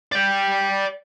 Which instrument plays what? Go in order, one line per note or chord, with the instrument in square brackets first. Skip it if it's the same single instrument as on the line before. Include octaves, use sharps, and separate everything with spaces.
[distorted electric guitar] D5 G5